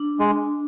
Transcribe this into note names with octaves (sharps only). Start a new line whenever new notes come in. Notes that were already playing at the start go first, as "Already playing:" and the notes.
Already playing: D4
G#3